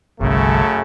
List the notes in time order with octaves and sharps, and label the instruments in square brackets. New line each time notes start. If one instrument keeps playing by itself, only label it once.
[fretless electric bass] G1 C2 [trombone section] F#2 C#3 A3